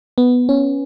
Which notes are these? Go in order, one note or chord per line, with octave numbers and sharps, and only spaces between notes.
B3
C#4